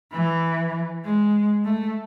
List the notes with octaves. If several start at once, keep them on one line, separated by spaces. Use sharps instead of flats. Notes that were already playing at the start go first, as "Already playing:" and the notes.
E3
G#3
A3